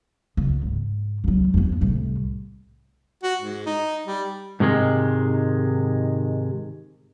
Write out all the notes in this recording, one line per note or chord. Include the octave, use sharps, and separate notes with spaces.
C#2
G#2
C#2 F#3
F2 B3
C2 A2
F#4
G#2
D#4
G3
G#2 C3 D#3 G#3